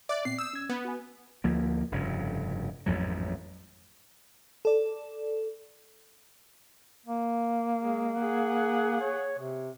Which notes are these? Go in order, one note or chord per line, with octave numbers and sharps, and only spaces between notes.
D5 E5 D6 F#6
A#2 B3 C4 C7
D#6 E6 G6
C#4 G#6
B3
F#4 G#5
D2 F3 A#3
F1 G2 C#3
A1 F2 G#2 F#3
A4 D5
A#3
G#3
G#4 F#5
C#5
C3